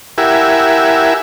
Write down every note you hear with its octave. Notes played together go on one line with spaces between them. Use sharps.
E4 G4 A#4 E5 F#5 G#5